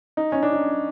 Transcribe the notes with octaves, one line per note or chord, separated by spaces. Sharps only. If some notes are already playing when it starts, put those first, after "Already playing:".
D#4
C#4
D4
D#4